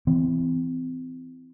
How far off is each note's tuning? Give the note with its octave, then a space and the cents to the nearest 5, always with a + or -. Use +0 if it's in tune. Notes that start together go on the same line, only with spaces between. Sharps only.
E3 +0 C4 -30